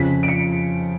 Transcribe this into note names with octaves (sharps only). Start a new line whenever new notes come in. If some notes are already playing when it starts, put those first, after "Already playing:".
Already playing: F2 C#3 F3 B6
D7
C#7